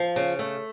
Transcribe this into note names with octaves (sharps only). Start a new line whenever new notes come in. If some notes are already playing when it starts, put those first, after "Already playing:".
Already playing: F3
C#3
A3